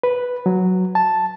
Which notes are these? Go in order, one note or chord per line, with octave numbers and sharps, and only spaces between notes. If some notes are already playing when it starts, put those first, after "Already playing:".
B4
F#3
A5